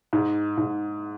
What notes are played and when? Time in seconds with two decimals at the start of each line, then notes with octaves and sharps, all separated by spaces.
0.13 G#2
0.57 G#2